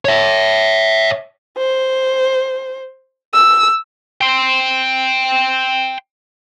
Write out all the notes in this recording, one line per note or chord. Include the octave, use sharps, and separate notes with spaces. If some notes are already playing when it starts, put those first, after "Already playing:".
C#5 E5
C5
E6
G5 C6